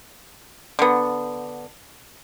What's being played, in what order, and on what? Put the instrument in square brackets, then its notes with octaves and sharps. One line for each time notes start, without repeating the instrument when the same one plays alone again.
[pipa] D3 B3